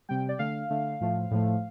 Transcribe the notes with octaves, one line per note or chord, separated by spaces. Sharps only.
C3 G3 G5
D5
D3 A3 F5
D3 A3
A2 F3 A3
A2 F3 A3